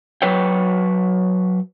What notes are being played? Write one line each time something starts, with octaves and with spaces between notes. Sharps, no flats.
F#3 B4 C#5 G5